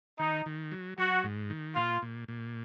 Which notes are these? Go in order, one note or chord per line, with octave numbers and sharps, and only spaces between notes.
D#3 D#4
D#3
F#3
F#3 F#4
G#2
D#3
A#2 F4
A#2
A#2